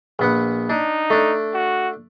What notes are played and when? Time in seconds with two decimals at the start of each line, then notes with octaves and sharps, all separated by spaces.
0.19 A#1 B3 F#5
0.70 D4 D#4
1.10 A3 D4
1.54 F#4